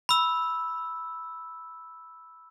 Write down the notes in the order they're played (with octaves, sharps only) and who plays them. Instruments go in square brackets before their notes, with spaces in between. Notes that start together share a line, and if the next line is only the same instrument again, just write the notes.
[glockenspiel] B5 E6